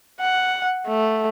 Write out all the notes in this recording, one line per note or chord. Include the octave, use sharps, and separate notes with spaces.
F#5
A3